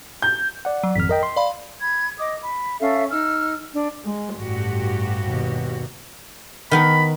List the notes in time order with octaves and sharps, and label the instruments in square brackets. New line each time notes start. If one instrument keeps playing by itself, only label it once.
[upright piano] G6
[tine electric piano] D5 F#5
[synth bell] F#3
[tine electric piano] G#1 F2 F6 [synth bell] B6
[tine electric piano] A#4 D#5 G5
C6
[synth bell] D5 F5 B5
[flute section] B5 G#6
D#5 D6 D#6
B5
C#4 A4 E5 F5
D#4 E6 F6
D4
[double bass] G#3
[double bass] A1 [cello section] G2 F#4 G4
[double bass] D#2 B2
[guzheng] D#3 B3 A#4 [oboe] B5